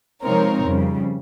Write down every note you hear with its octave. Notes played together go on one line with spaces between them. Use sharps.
C3 F3 G#3 C4 D#4 A#4 C#5
F2 C#3 G3